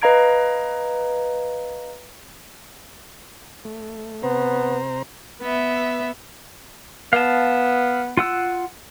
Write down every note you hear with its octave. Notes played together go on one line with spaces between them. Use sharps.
B4 D#5 F5 A#5 G#6 D7
A3
C3 B3 C5 A#5
B3 E5
B3 F5 A5
F4 F#5 E6